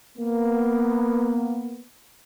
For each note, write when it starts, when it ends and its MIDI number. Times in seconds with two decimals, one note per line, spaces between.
0.18 1.81 58
0.18 1.81 59